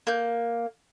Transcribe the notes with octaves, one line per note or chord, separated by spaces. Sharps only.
A#3 G6